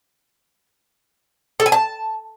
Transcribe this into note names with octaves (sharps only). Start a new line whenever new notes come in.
A4
G#5
A5